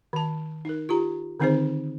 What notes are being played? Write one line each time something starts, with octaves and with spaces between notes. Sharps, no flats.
D#3 A5
D#4 A#4
F4 G4 A#5
D3 D#3 C4 D#4 G#4 C5